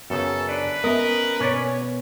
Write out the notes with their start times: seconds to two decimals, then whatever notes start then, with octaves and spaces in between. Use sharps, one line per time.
0.10 F#2 C#3 B3 A4
0.49 D4 B4
0.84 B3 C#4 A#4 D#5 E5
1.40 B2 C#4 C#5 D5